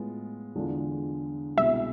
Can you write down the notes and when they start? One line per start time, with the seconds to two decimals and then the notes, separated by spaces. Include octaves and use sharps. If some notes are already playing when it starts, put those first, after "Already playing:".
Already playing: A2 G#3 B3 F4
0.55 E2 D3 G#3 D4 F4
1.57 C2 B2 G#3 B3 E4 E5